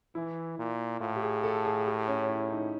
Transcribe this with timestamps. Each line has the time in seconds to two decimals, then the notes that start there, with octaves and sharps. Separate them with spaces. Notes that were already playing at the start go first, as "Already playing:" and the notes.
0.15 E3 E4
0.59 A#2
1.01 A2 F4
1.16 G4
1.22 G#4
1.43 A4
1.65 G#4
1.86 G4
2.08 C#4
2.29 E4
2.50 D#4